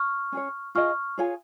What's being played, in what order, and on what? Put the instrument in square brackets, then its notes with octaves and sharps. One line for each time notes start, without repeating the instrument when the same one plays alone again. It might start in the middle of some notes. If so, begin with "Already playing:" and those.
Already playing: [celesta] C#6 F6
[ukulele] C#4 G#4 C#5
[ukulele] F4 G#4 D#5 [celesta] C#6 F6
[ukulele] F4 G#4 C#5 G#5